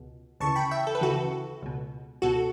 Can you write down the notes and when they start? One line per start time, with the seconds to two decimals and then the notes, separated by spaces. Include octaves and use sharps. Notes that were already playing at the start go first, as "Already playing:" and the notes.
Already playing: C#2 B2
0.40 D2 C#3 E3 A5 C#6
0.56 G5 B5
0.71 E5 G5
0.87 A4
0.95 B4
1.01 D2 C#3 E3 F#4 A4
1.62 C#2 B2
2.22 C#2 B2 F#4 A4